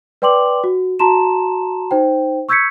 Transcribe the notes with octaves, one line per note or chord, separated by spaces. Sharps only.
B4 D5 G5 C6 D6 F#7
F#4
F#4 A5 A#5 C6 E7
D#4 C5 G5
C#6 E6 G6 G#6 B6 C#7